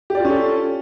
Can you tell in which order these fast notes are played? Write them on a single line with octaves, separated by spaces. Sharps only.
G4 D5 F4 C#4 A4